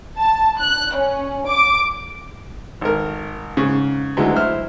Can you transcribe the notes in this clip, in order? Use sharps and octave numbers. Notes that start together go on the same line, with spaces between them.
A5
F#6
C#4
D6
G#1 A#4
G#2 C#3
D2 E3 F#3 G#3
E4 C5 F6